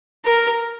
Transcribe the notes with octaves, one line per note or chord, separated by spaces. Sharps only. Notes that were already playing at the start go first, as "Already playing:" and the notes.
A#4